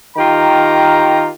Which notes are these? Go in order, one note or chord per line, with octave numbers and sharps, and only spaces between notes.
D#3 F4 G4 A#5